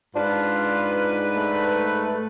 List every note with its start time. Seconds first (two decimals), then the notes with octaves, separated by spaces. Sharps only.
0.16 G#2 D4 F4 B4
1.36 A3